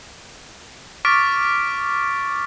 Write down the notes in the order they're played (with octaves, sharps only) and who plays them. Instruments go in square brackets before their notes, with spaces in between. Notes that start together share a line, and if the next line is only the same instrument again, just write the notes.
[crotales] C#6 D6 F6 A6 B6 D7